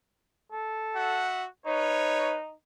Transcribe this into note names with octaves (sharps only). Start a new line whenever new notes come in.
A4
F#4 E5 F#5
D#4 B4 C#5